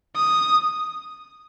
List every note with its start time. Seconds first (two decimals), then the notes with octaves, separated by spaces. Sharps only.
0.16 D#6